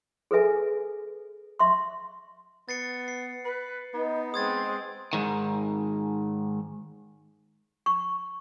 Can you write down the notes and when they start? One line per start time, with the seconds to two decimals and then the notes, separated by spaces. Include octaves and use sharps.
0.31 G#4 A4 B4 E5 G#5
1.59 E5 C6 C#6
2.69 B3 A6 C7 C#7
3.08 C7
3.45 B4
3.94 B3 D#4
4.34 G#3 C4 C6 D#6 G#6 A6
5.13 G#2 D#3
7.86 C#6